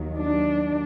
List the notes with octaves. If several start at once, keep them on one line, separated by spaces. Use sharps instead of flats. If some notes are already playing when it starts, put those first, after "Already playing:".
Already playing: D#2 D#3 F#3
D4